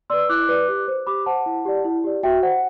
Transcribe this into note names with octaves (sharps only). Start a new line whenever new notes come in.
B4 D5 C6 E6
E4 D6 F#6
B4 D5
G4
C5
G4 B5 D6
C5 F#5 A5
E4
G4 D5
E4
G4 D5
F#4 E5 G5
C5 F#5